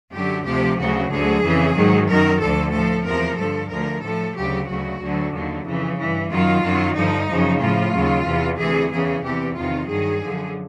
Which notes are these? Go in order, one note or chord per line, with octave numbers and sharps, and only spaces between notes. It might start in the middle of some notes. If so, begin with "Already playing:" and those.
F#2 D3 F#3 G4
D2 C3 F3 G4
D2 C#3 F#3 F#4
D2 D3 F#3 G#4
F2 C#3 E3
G#2 D#3 F#3
F#2 D#3 F#3 A#4
D2 D3 F3 A4
A2 F3 A4
E2 C3 F3 A#4
G2 D3 F3 A4
D2 D3 F3 A#4
A2 F3 A4
D2 C#3 F#3 G4
D2 C#3 F#3 F#4
D2 D3 F#3
D#2 D3 F#3
F2 C#3 E3
G2 E3
F#2 D#3 F#3 F4
F#2 D#3 F#3
G2 D3 F3 D#4
F#2 C#3 F3
A2 F3 F4
D#2 C#3 F#3
E2 C3 E3
D2 C3 E3 G#4
E2 C#3 E3 G#4
E2 C3 E3 G4
E2 C3 D#3 F4
G2 D#3 F#3 G#4
F#2 D3 F3